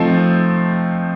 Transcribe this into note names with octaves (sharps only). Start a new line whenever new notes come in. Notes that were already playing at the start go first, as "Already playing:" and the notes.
Already playing: F3 A3 C4 D#4